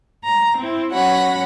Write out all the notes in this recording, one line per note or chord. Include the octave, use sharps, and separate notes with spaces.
A#5
C4 E4
F#3 C#4 F#4 F#5 B5 A#6